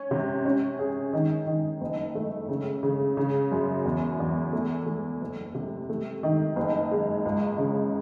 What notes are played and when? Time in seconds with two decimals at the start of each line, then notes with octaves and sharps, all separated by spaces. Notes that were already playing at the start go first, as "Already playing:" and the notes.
Already playing: C#4
0.11 C3
0.45 C#4
0.79 G#4
1.13 D#3
1.46 D#3
1.81 F#1
2.15 A3
2.49 C#3
2.83 C#3
3.17 C#3
3.52 F#2
3.85 E2
4.20 E2
4.53 A3
4.86 A3
5.21 F#1
5.55 C3
5.89 A3
6.23 D#3
6.56 F#1
6.91 G#3
7.25 C#2
7.58 C#3